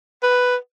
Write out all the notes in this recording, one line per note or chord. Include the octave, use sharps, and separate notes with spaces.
B4